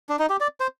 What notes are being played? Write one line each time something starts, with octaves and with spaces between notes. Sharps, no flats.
D4
D#4
G4
D5
C5